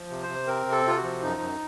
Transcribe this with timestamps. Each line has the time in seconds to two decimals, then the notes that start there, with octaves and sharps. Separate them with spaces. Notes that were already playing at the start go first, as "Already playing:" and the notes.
Already playing: F3
0.10 C3
0.23 C5
0.29 C3
0.47 C4 A#4
0.66 C3
0.72 A4
0.85 C3 F4
0.97 F#4
1.04 F3
1.23 F#2 D#4
1.41 F#2